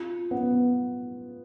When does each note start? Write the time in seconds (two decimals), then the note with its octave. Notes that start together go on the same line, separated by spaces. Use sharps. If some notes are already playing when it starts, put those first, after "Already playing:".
Already playing: F4
0.31 B3